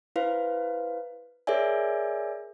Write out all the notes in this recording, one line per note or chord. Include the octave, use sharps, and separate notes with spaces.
E4 B4 C5 F5
G#4 A#4 C#5 D5 E5 G#5